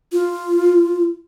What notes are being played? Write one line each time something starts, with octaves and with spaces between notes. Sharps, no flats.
F4